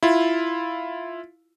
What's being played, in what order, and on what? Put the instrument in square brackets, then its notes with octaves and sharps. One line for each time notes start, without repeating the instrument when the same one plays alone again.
[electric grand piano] E4 F4